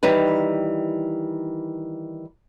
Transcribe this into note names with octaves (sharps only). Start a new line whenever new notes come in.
D#3 E3 G3 D#4 B4